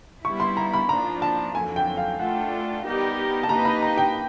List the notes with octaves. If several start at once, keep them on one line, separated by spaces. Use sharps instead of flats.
G3 B3 E4 C#6
C6
A#5
B5
F3 A#3 D4 A#5
A5
F2 D3 F#3 A#3 G#5
G5
F5
A3 D4 F4 A4 F#5
G3 B3 D#4 G4 A#4
A5
A#3 D#4 G4 B4 D#5 A#5
B5
A#5
G5